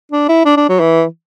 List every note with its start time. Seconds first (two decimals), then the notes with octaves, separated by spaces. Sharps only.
0.12 D4
0.29 E4
0.46 D4
0.57 D4
0.69 F#3
0.80 E3